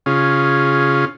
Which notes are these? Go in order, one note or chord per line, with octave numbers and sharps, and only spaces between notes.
C#3 C#4 F4 G#4